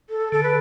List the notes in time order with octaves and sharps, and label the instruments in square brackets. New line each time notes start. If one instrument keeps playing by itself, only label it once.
[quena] A4
[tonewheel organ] D3 [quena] A4
[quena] B4